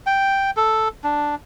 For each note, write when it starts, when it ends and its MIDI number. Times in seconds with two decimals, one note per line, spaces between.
0.06 0.51 79
0.57 0.88 69
1.04 1.35 62